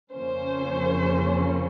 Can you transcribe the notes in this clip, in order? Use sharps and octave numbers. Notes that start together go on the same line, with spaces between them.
F2 C#3 F3 A#3 C#4 C5